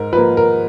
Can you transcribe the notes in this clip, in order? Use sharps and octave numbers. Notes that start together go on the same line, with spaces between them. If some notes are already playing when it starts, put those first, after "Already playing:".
Already playing: G#2 A#4
F3 A#3 B4
A#4